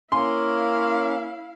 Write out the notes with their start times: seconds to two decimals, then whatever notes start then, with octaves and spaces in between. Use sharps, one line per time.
0.12 A#3 C#4 E4 F5 C6